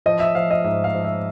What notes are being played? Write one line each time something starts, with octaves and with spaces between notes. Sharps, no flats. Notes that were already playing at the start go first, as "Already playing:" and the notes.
F3 D#5
E5
F3 F5
D#5
G#2 E5
F5
F3
E5